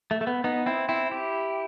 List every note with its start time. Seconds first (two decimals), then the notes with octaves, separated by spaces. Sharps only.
0.11 A3
0.21 A3
0.27 B3
0.44 B3 D#4
0.66 C4 E4
0.89 C4 E4
1.11 E4 G4